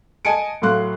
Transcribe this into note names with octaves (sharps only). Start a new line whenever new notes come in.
D#5 G#5 A5 C#7 D7
A2 F#3 F5 C6 F#6